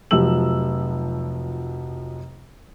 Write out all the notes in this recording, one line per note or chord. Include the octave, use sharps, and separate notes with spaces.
F1 F3 F#3 E6 F#7